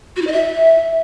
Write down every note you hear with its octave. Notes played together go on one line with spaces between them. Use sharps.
F#4
E4
D#5
E5